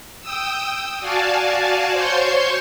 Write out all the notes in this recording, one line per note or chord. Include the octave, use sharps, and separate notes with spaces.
G5 D#6 E6
F#4 D5 F5 G#5 A5
C5 C#5 C6 C#6 G6